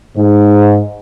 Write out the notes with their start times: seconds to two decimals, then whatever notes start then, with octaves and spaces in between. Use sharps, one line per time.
0.18 G#2